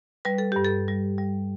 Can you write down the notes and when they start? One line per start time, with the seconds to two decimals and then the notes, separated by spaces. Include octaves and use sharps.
0.25 G3 B4
0.38 A4
0.52 G2 G4
0.65 A4
0.88 G3
1.18 G3